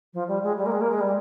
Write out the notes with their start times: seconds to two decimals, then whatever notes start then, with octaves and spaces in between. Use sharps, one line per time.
0.13 F3
0.28 G3
0.43 G#3
0.57 G3
0.66 A#3
0.71 G#3
0.81 A#3
0.91 G#3
1.00 G3